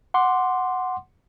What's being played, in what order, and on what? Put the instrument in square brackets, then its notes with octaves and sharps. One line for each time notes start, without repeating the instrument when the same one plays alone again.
[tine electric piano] F#5 C6 D6